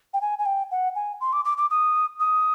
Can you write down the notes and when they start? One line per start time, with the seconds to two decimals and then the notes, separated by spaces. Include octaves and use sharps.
0.14 G5
0.21 G#5
0.39 G#5
0.46 G5
0.71 F#5
0.95 G#5
1.21 C6
1.33 D6
1.45 D6
1.57 D6
1.70 D#6
2.20 D#6